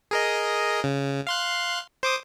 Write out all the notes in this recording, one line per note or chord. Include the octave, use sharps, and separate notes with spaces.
G#4 A#4 D#5
C#3
F5 C6 F#6
C5 D6 D#6